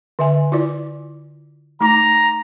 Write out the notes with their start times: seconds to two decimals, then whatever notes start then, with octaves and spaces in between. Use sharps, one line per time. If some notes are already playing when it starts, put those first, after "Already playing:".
0.19 D3 E5 G#5
0.52 E4 F4 D5
1.81 A3 D#4 A#5 D6